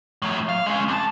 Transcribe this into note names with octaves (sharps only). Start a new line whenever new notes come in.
A2 F#3
F5
G#3 C#4
D#2 A5